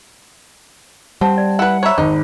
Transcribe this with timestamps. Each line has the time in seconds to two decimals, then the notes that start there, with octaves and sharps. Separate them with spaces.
1.21 G3 C4 F#5 A5
1.38 D5
1.59 E4 B4 F#5
1.83 C5 C#5 E5 A#5 B5
1.98 G#1 D#4